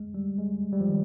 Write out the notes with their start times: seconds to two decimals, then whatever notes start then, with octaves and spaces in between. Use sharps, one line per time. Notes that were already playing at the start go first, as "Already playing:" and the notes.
Already playing: G#3
0.14 G3
0.38 G#3
0.73 G3
0.80 F3
0.89 D#3